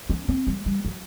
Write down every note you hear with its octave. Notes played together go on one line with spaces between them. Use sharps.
C#4
C4
G3
G3
F#3